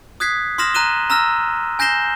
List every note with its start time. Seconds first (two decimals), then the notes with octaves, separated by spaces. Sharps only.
0.20 D#6 F#6 G#6 B6 C7
0.58 C6 D#6 F6 A#6 E7 F#7
0.74 A#5 F#6 D#7 E7 G7
1.10 A#5 E6 F6 A#6
1.79 G#5 G6 A#6 C7 E7 G7